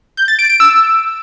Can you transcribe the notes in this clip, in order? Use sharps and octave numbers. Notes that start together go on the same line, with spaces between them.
G6
A6
D7
D7
E6